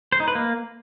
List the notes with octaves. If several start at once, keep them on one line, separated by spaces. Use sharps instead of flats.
C5
D#4
B4
A#3